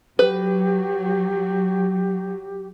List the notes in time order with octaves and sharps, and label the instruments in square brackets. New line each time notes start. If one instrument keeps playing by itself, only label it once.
[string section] F#3 [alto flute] G4 [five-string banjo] B4